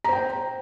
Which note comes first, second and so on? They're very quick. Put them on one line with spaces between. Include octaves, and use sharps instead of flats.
A#5 C5 G5